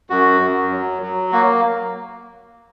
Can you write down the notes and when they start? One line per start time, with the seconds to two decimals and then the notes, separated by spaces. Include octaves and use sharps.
0.10 F#2 F#4
0.41 F#2
0.72 F#3
1.02 F#3
1.32 A#3 F#4